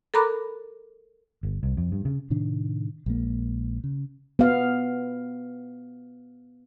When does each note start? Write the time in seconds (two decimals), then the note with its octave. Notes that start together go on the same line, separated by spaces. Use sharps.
0.14 A4 A#4 A#5 B5 D6 F#6
1.43 G1
1.63 C2
1.77 F2
1.92 G2
2.05 C#3
2.30 A2 C3 D#3 D4
3.06 A#1 G#3 A#3
3.84 C#3
4.39 B3 F5